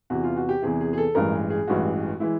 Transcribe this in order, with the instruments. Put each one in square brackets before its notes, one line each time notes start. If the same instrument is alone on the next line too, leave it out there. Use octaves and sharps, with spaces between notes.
[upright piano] E2 C3 E3 F#4
F4
F#4
G4
E2 C3 E3 G#4
G#4
G#4
A4
A1 G2 E3 G#3 A#4
G#4
A1 G2 E3 G#3 F#4
E3 G#3 E4